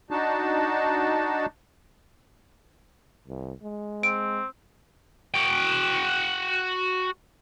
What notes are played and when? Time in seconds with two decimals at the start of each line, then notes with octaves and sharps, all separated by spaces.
0.11 D4 D#4 F#4 A5
3.28 C2
3.63 G#3
4.03 C4 D7
5.34 F#4 G5